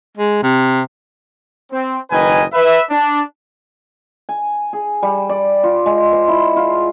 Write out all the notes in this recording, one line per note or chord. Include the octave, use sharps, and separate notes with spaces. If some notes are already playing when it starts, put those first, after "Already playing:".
G#3
C3
C4
F#1 D#3 B4 D#5 G#5
B4 E5
D4
G#5
G#4
G3
D5
F4
G#3
C5
E4
F4